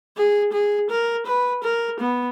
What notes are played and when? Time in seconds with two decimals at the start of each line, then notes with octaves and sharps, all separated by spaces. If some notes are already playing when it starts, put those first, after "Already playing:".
0.17 G#4
0.53 G#4
0.90 A#4
1.27 B4
1.64 A#4
2.00 B3